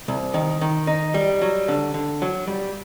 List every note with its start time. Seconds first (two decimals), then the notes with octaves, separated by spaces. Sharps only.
0.08 C2
0.34 D#3
0.61 D#3
0.87 D#4
1.14 G3
1.42 F#3
1.68 D3
1.94 D3
2.22 F#3
2.48 G3